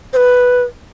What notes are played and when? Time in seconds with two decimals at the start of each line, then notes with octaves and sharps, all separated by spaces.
0.13 C5
0.17 B4